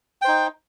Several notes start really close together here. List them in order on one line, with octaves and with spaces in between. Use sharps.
G5 C5 D#4